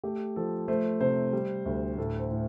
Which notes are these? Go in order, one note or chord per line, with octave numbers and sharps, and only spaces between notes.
A3 G4
F3 A4
A3 C5
C3 C5
G3
D2
A2 A4
C5
A2